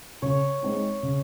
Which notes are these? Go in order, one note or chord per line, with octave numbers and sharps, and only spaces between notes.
C#3 C#5
G#3 C4 D#4
C#3